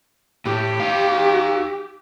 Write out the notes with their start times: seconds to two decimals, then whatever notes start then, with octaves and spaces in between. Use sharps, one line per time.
0.45 A2 G4
0.80 D#4 F5